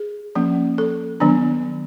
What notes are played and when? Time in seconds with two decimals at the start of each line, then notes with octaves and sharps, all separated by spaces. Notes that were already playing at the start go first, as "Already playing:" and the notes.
Already playing: G#4
0.35 F3 A#3 C#4
0.78 A4
1.20 D#3 F#3 B3 D4